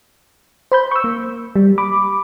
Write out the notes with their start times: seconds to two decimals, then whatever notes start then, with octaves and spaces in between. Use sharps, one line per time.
0.72 C5 B5 G6
0.91 C#6 E6
1.04 A#3
1.56 G3
1.78 B5 D6